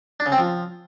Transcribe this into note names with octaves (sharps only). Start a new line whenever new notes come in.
D4
C#3
C4
F3